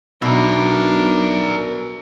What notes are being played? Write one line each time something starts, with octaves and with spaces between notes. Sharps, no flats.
B1 B2 D4 A#4 E5